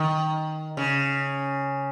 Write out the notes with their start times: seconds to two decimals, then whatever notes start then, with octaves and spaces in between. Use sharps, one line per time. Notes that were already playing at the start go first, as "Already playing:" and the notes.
Already playing: D#3
0.77 C#3